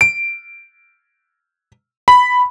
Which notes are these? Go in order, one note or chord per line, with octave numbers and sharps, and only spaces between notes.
D7
B5